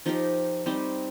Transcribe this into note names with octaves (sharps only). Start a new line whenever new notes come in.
F3 D#4 G4 A#4
G3 C4 D#4 G4